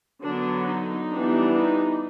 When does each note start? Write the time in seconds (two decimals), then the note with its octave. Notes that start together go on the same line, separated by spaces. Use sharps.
0.23 D3 F#3 B3 D4
0.67 D#4
1.10 E3 G3 B3 D4
1.54 D#4